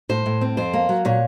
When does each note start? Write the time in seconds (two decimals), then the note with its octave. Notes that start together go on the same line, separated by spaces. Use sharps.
0.09 A2 C5
0.26 A2
0.41 C4
0.57 F2 C5
0.73 A#3
0.89 F#3
1.05 A#2 C#5